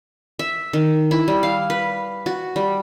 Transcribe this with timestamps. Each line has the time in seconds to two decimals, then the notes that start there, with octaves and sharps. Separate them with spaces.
0.39 E5
0.73 D#3
1.11 E4
1.28 G3
1.43 F5
1.70 B4
2.26 F#4
2.56 G3